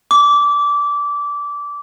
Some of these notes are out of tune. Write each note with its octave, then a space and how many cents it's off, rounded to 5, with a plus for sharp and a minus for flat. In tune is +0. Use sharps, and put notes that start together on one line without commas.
D6 -20